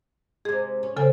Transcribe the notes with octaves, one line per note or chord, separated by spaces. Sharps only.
C3 G#3 G#4
C#4
C#3 C4 A4 G#5